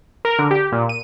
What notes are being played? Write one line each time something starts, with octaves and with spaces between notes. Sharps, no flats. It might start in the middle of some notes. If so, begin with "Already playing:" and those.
A#4
D3
G4
A#2
D#7